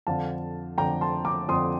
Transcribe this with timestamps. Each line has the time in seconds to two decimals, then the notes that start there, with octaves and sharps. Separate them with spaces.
0.07 F2 D3 F5 A5
0.78 F2 D3 G5 A#5
1.01 A5 C6
1.25 A#5 D6
1.48 F2 D3 C6 D#6